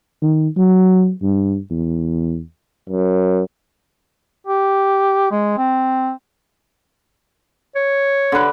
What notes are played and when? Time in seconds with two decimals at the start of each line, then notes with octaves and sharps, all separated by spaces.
0.22 D#3
0.57 F#3
1.22 G2
1.70 E2
2.90 F#2
4.47 G4
5.31 G#3
5.58 C4
7.75 C#5
8.32 D3 B4